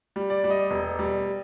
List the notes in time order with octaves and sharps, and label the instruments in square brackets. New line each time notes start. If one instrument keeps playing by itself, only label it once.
[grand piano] G3
D5
G3
D#5
E1
G3